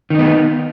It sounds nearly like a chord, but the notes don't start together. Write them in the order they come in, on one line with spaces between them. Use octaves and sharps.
D#3 D#4 B3